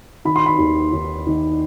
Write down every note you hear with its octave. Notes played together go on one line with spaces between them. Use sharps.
D#3 B5
C6
B5
D#2
D#2
D#3